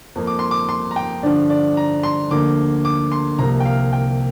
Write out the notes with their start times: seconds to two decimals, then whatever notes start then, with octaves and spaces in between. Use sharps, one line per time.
0.15 F2 F3 A#3
0.27 D6
0.39 C6
0.51 D6
0.69 C6
0.91 A#5
0.96 G5
1.23 G2 D3 F3 D5
1.50 D5
1.77 A#5
2.03 C6
2.31 D2 D3 F3 A#3 D6
2.85 D6
3.12 C6
3.38 C2 C3 F3 A#3 A#5
3.60 G5
3.65 F5
3.93 G5